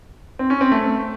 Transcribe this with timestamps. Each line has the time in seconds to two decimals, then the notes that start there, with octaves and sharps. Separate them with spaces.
0.39 C4
0.50 C#4
0.61 C4
0.72 A3